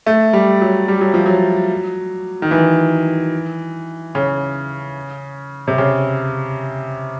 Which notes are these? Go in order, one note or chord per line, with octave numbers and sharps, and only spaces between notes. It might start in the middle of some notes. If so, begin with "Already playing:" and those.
A3
G3
F#3
G3
F#3
F3
F#3
D#3
E3
C#3
C3
C#3